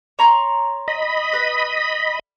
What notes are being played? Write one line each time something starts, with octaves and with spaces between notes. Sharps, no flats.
C#5 A#5 C6
D#5 B5
B4